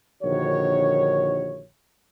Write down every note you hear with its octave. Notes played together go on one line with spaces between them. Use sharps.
A#1 D3 D#3 F#4 C#5